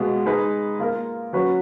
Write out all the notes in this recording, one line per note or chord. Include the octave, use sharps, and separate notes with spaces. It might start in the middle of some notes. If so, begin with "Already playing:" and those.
Already playing: B2 G#3 B3 F4
G#3 D#4 G#4 B4
A#3 F4 A#4
F#3 C#4 F#4 B4